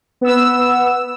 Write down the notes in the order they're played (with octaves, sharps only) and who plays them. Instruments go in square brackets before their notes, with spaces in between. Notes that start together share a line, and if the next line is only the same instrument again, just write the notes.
[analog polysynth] B3 E6